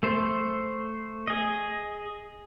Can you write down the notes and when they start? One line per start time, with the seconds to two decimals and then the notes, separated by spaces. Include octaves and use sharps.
0.03 A3 C5
1.27 G#4 D#5